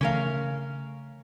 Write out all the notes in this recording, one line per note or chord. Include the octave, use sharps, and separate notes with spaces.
C#3 E3 A3 C#4 A#4 F5